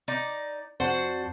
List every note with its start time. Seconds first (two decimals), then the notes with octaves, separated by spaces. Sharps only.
0.08 D#4 D5
0.80 F2 D4 F#4 C5